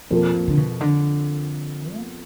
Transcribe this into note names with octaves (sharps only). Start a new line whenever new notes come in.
F2 B2 F3 A#3
A#2
D3
B2
D3
B3